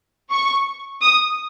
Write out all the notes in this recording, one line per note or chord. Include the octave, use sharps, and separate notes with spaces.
C#6
D#6